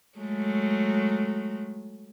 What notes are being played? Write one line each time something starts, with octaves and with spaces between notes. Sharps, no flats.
F#3 G#3 A3